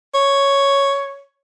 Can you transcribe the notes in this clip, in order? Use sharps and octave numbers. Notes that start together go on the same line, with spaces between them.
C#5